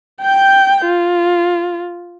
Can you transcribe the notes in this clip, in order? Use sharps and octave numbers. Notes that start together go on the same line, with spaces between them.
G5 G6
F4